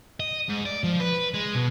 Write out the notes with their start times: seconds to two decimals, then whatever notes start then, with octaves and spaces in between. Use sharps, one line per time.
0.20 D#5
0.49 G#2
0.65 D5
0.84 F3
1.00 B4
1.34 G#3
1.55 B2